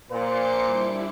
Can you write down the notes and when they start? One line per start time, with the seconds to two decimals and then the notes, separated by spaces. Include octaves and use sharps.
0.11 A#2 C5 C6 D6 C#7
0.62 G3 D4 E4